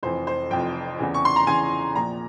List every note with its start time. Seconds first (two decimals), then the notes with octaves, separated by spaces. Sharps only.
0.03 F1 F2 E3 C5
0.27 C5
0.50 F1 F2 E3 G5
0.99 E2 C#3 E3
1.14 C#6
1.25 C6
1.36 A#5
1.47 E2 C#3 E3 G#5
1.95 A#1 A#2 F3 A#5